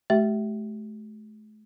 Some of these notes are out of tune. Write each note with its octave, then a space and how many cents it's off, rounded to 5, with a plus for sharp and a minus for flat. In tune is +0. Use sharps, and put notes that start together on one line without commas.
A3 -40 G4 -35 E5 +0